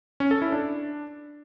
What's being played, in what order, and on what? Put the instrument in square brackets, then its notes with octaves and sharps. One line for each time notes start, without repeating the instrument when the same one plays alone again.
[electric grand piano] C#4
A4
E4
D4